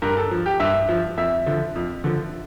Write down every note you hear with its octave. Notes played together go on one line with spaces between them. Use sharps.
G2 A#4
A4
F3
G4
G2 E5
F3
F2 E5
D3 F3
F2
D3 F3